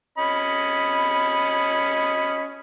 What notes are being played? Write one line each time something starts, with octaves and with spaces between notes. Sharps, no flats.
C#4 D#5 B5